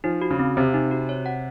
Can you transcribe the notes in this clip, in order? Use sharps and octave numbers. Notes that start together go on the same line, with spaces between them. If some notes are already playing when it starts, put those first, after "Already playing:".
F3 D#4
F#4
C#3
C4
C3 C4
D#4
F#4
C#5
F#5